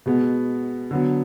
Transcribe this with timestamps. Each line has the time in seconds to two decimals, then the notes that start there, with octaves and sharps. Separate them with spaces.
0.06 B2 G#3 B3
0.91 D3 F#3 B3